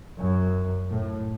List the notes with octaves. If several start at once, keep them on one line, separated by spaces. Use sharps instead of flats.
F#2
A2